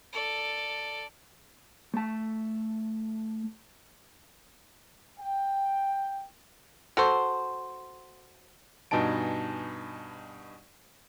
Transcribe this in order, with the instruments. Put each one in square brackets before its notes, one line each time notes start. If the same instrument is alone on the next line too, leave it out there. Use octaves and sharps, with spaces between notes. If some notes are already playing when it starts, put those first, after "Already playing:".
[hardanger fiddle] A4 D5
[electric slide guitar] A3 A5
[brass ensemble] G5
[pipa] F#4 A4 C5
[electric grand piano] G2 B2 D#4 G#5 A5 D7